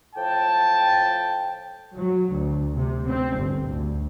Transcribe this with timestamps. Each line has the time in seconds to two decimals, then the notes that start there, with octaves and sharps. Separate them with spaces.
0.15 A2 F3 G5 A5
1.95 F#3
2.29 D2
2.75 C3
3.06 C4
3.37 G1
3.70 D2